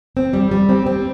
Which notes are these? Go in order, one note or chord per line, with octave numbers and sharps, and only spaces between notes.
C4
G3
G3
C4
C4